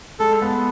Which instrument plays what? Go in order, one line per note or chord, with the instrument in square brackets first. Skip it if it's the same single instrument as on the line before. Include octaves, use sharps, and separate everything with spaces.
[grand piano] G#3 [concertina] A4
[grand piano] B3